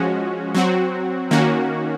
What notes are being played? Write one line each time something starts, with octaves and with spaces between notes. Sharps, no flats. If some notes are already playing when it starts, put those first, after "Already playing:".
Already playing: F3 G#3 C#4 F#4
F#3 C4 F#4
D#3 A#3 C#4 F#4